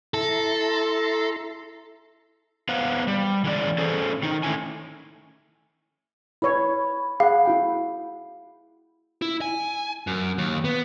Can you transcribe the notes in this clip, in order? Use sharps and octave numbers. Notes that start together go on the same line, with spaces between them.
E4 A4 A#5 C6
B3 B4 C5 F5 F#5
G3
E3 G#3 C#4 D5
C#4 G#4 A4 C5
D#3 D#4
A3 C#4 E4 G#5
E4 B4 C#5 B5
G#4 F5 F#5
E4 F#4 G5
E4
G#5
F#2
D#2
B3